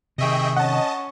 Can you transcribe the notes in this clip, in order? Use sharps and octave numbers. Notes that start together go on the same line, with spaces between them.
C3 D#3 G#4 D#5 E5 G5 C#6
C#4 D#5 F#5 A5 C#6